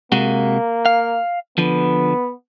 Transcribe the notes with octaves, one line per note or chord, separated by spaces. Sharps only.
C3 G#3 A#3 F#4
F5
D3 F3 B3